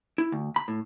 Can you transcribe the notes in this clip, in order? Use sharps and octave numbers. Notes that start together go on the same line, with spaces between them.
E4
D2
B5
A2